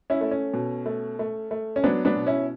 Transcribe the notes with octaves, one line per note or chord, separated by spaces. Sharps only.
C#4 E4
A3
C#4
B2
A3
A3
A3
C#4
F#3 B3 D4
B3 D4
B2
C#4 E4